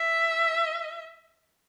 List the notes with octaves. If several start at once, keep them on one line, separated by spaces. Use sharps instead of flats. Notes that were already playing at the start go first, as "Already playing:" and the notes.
Already playing: E5